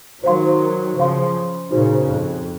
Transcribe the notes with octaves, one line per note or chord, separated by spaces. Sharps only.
D#3 F#3 C5 F5 C6
C#3 F3 C5 F5 C6
A#2 C#3 D#4 F#4 C5
F2